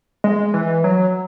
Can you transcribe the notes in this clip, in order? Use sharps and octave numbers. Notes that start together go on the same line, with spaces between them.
G#3
E3
F#3